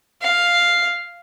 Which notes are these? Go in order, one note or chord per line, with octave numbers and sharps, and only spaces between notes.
F5